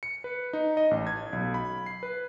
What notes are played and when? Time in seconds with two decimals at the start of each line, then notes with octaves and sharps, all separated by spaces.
0.03 C#7
0.24 B4
0.53 D#4
0.77 D#5
0.91 A1
1.07 G#6
1.33 B1
1.54 B5
1.86 C7
2.03 B4